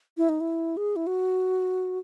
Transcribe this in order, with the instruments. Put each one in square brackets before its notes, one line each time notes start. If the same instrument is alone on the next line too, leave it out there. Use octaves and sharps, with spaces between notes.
[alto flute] E4
D#4
E4
G#4
E4
F#4